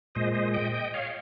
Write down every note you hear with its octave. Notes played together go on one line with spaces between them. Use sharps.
A#2 G#3 C5 D#5
C5 D#5
D#5 G5
D#5 G5
C#5 F5